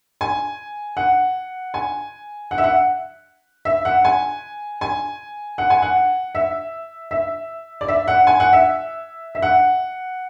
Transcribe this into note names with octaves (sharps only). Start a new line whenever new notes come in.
G#5
F#5
G#5
F#5
E5
F#5
E5
F#5
G#5
G#5
F#5
G#5
F#5
E5
E5
D5
E5
F#5
G#5
F#5
E5
E5
F#5